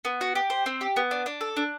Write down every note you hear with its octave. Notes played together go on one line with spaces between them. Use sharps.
B3
F#4
G4
C5
C4
G4
B3
D4
D4
A4
D4